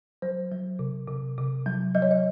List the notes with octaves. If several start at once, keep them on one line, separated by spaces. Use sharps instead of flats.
F#3 C5
F#3
C3
C3
C3
F#3
F#3 D#5
C#5
D#5